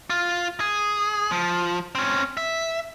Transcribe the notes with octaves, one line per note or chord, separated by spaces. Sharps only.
F4
G#4
F3
C4 C#4
E5